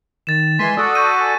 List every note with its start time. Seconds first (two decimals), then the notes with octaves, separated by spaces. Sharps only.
0.27 D#3 A6 E7
0.59 E3 G#3 G#5 C6 B6
0.77 F#4 A4 D5 D#6
0.95 C#6 G6 D#7
1.20 G#5